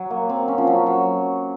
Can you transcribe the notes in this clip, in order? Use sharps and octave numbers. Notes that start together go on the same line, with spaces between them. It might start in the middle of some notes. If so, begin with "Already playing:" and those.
Already playing: F#3
A#3
C4
C#4
F3
F#3
F#3